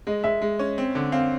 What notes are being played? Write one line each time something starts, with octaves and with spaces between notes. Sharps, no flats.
G#3 D#5
G#3 E5
G#3
C#4
C4
D3
C4 F5